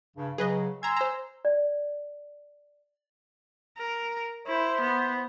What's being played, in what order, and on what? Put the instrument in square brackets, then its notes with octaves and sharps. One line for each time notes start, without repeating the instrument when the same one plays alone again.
[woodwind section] G2 C#3
[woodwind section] C#3 F#3 [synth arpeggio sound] G#4 B4 D#5
[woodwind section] G#5 C6 E6 [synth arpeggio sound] A#5 G#6
[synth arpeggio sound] C5 A#5
[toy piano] D5
[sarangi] A#4
[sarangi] E4 [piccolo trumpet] C5
[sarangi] B3